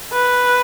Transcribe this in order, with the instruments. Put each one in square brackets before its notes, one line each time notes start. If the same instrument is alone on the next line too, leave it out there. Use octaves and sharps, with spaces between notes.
[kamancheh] B4